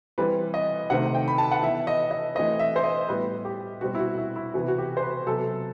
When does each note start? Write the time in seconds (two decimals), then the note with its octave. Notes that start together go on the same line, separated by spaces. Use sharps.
0.18 E3 G3 C4 B4
0.54 D#5
0.90 C3 D#3 A3 C4 F#5
1.15 G5
1.28 B5
1.38 A5
1.51 F#5
1.63 E3 B3 E5
1.87 D#5
2.11 D#5
2.35 E3 A3 C4 D#5
2.59 E5
2.76 C5
2.84 D#5
3.08 A2 G3 B3 B4
3.45 G4
3.81 B2 G3 C4 F#4
3.95 E4
3.99 F#4
4.18 E4
4.36 E4
4.54 C3 E3 B3 F#4
4.68 F#4
4.78 G4
4.97 C5
5.02 B4
5.26 C3 F#3 B3 A4